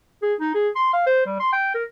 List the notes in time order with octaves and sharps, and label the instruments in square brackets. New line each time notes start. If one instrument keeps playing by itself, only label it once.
[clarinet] G#4
D#4
G#4
C6
F5
C5
G3
C6
G5
A#4